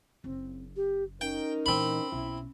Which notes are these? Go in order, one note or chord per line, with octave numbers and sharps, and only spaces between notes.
F#1 C4
G4
C#4 D#4 A#4 G5
A#2 E3 C4 B5
B1 E4